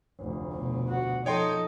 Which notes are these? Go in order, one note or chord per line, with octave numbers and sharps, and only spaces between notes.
F1 D2
B2
F#4
F3 D#4 A4 C#5 D#5 G5 C6